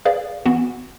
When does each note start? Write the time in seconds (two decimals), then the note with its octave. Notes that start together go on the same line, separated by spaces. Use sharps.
0.05 G#4 B4 D5 F5
0.46 E3 B3 F#4